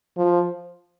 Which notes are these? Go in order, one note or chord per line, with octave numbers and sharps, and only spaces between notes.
F3